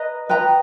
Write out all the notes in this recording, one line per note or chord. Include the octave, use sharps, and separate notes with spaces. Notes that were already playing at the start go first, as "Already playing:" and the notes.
Already playing: B4 D#5 A#5
B4 D#5 G5 A#5